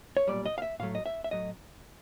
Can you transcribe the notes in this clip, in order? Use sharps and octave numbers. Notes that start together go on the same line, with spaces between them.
C#5
B1 A#2 G3 D5
D#5
F5
E5
A2 F#3 A3 F5
D#5
E5
E5
A2 F#3 A3 D#5